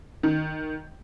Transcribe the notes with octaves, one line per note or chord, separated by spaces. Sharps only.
D#3